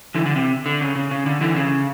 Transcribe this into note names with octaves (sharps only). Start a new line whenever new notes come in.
D3 E3
D3
C3
D3
C#3
C#3
C#3
D3
D3 E3
C#3